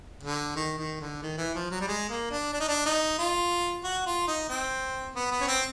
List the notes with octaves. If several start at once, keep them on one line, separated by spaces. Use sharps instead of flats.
D3
D#3
D#3
D3
D#3
E3
F3
F#3
G3
G#3
A#3
D4
D4
D#4
D4
D#4
F4
F#4
F4
D#4
C4
B3
B3
C#4
C4